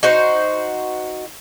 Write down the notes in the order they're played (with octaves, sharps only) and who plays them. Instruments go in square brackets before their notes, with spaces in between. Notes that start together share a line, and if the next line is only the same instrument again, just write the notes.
[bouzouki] D#4 F#4 C5